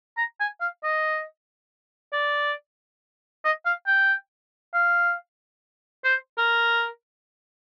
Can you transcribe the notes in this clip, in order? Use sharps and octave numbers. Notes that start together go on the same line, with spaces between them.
A#5
G#5
F5
D#5
D5
D#5
F5
G5
F5
C5
A#4